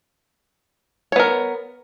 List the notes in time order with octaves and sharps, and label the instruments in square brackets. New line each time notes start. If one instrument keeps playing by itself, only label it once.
[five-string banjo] C#5
B3
A#4